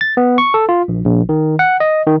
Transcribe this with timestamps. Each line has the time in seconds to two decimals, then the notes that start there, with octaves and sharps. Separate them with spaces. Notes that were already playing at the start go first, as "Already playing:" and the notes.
0.01 A6
0.17 B3
0.38 C#6
0.54 A4
0.69 F4
0.88 A#1
1.05 A#1
1.29 D#3
1.59 F#5
1.80 D#5
2.07 D#3